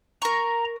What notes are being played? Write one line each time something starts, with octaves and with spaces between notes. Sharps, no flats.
A#4 A#5 C#6